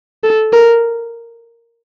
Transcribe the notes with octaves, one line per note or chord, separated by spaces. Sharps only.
A4
A#4